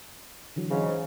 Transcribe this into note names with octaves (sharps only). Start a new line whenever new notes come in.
D3 E3 F#3
G#2 C#3